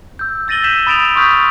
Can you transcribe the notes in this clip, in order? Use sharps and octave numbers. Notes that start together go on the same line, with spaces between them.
E6 G6
E6 A6 A#6 D#7 F#7 G7
G6 B6 E7 G7
B5 D#6 A6 D7 E7 F7
C6 C#6 D#6 F6 G6 B6